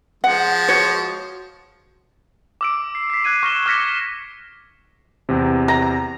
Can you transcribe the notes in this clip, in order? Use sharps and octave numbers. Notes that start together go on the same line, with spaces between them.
F3 G#3 F#5
F#4 C#5
D6 E6 D7
C7
B6 C7
F#6 G#6 D#7
C#6 F6 A#6 C#7 E7 G7
D6 F6 G#6 A#6 B6 C#7
E2 C3
A#5